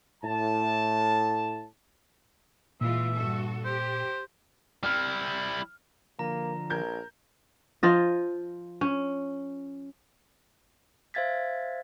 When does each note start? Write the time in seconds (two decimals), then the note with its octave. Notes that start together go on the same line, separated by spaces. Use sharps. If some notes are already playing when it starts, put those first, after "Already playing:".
0.24 A2 A5
2.81 A#2 E3 G#3 F4 E5
3.15 G2 F#4 A4
3.65 G4 C5
4.83 G3 E4 F6
6.19 D3 F3 A#3 A#5
6.70 A#1 A#4 G6 G#6
7.83 F3 F4 D#5
8.81 C#4
11.14 C5 E5 F5 G#6 A6 B6